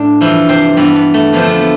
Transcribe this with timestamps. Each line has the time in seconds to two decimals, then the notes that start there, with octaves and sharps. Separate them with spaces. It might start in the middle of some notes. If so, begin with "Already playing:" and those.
Already playing: A2 D4
0.21 G2 E3 F3 E4
0.49 C3 C4
0.77 G2 E3 B3
0.96 B3
1.14 A3
1.33 F2 D3 F3 B3
1.42 A3
1.50 B3
1.61 B3